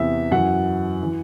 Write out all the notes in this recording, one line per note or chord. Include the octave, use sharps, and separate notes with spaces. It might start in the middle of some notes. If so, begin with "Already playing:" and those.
Already playing: E2 C3 E3 E5
F#2 E3 F#5
E3